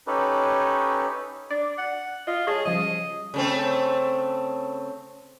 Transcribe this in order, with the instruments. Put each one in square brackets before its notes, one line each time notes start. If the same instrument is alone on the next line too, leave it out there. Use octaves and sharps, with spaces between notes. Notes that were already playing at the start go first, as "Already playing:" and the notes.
[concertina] C#4 D#4 G4 A4 B4
[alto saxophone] D4 [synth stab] D5
[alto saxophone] F#5
[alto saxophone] F4 [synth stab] D#5
[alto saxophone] G#4 [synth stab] C#5 D#5 A5
[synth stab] C#3 F3 G3 [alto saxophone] D#5
[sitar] C#3 A3 C4